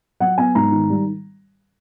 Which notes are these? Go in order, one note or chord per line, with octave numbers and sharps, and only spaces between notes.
F#3 F#5
B3 G#5
G#2 A#5
D#3
G3